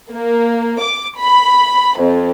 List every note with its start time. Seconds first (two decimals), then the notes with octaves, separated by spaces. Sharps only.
0.12 A#3
0.81 D6
1.20 B5
1.98 F2